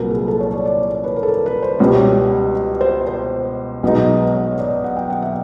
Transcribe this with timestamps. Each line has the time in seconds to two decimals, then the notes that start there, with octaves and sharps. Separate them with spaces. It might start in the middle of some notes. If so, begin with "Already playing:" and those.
Already playing: C2 A#2 F#3 A#4 B4
0.11 G#4
0.28 A4
0.40 C#5
0.53 D5
0.66 D5
0.79 C#5
0.91 C#5
1.04 B4
1.16 A#4
1.23 A4
1.28 A#4
1.46 B4
1.63 C5
1.79 C#2 B2 G3 C#5
2.81 C5
3.07 C5
3.83 B1 B2 G#3 B3 D#4
4.34 C#5
4.59 D5
4.84 F#5
4.97 G5
5.10 F#5
5.22 E5